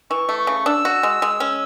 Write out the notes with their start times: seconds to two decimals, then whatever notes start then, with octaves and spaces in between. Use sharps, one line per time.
0.10 E3 C#6
0.29 A3
0.38 C#6
0.47 C#3
0.66 D4 E6
0.85 F#4
1.03 G#3
1.22 G#3
1.40 C#4